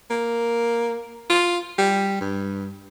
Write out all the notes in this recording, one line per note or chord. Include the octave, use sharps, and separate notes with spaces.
A#3
F4
G3
G2